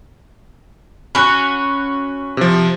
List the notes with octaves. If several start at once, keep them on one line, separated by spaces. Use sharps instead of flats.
C#4 F#4 B5 F#6
C3 F3